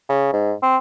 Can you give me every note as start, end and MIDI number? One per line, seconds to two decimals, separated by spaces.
0.09 0.29 49
0.33 0.53 44
0.62 0.77 60